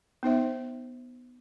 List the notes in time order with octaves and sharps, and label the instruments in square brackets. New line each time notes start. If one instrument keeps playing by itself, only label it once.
[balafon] B3 D#4 C5 E5